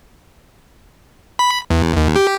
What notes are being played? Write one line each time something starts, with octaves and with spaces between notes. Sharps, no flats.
B5
E2
D#2
G4